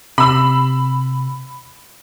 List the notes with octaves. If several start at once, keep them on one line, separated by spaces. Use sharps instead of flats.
C3 B5 E6